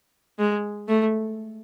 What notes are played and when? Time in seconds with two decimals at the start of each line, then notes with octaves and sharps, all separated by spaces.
0.39 G#3
0.88 A3